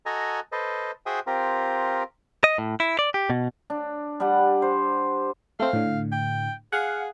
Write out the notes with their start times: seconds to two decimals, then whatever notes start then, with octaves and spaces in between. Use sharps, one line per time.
0.06 F#4 A4 D#5 G#5 A#5
0.52 A4 B4 C5 D#5
1.06 F#4 G#4 C5 E5 G5 D#6
1.27 C4 F4 G4 A#4
2.44 D#5
2.58 A2
2.80 E4
2.99 D5
3.14 G4
3.30 B2
3.70 D4
4.20 G3 D4 G4 F#5
4.62 C5
5.60 A3 C4 F5
5.73 A2 D3
6.12 G5
6.72 G#4 F5 F#5